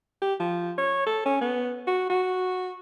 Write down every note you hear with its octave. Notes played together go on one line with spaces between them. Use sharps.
G4
F3
C#5
A4
C#4
B3
F#4
F#4